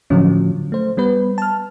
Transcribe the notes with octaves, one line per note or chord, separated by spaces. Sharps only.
A2 D3 F3 F#3 C#4
A3 C5
G3 B3 B4
A5 F6